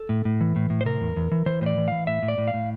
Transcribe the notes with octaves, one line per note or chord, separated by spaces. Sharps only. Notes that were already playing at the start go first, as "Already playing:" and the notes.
Already playing: A4
A2
A2
E3
A2
A2
C5
C3 A#4
E2
E2
E3
E3 C5
A2 C5
D5
E3
E3 F5
A2 E5
A2
D5
A2
F5
A2